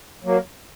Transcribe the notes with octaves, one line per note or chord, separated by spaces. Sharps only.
F#3 A#3